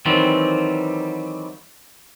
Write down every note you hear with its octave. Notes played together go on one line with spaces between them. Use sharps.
D#3 E3 F#3 G3 C4